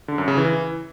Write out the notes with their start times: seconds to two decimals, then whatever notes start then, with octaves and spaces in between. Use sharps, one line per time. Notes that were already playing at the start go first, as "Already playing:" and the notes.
0.08 D3
0.18 F#2
0.28 C#3
0.37 E3